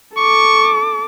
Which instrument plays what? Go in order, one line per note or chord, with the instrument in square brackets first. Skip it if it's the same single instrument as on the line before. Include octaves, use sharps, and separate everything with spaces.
[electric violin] A4 D6 [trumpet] C#6